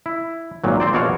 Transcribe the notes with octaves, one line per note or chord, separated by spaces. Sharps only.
E4
G#1 A#2 F#3
C4 C5 D5
A#1 B2 F#4 C#5 D5 F5